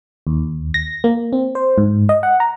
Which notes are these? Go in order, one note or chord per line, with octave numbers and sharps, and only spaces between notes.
D#2
A#6
A#3
C4
C5
G#2
D#5
F#5
A#5